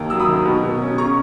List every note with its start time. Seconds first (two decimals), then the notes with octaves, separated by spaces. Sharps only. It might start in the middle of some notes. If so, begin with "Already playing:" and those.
Already playing: D#2 A#3
0.10 F#3 E6
0.20 B5 D#6
0.28 D#3
0.45 B2
0.63 B2
0.82 C#4
0.98 C#3 A#5 C#6